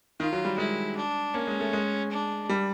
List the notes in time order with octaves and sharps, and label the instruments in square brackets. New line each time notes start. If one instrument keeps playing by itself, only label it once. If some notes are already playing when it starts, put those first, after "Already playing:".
[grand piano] D#3 [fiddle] F4
[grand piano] F#3
G3
[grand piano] G#3 [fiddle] E4
[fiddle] D4
[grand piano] A#3 [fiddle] C#4
[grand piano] G#3
A3
G#3
[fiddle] D4
[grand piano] G3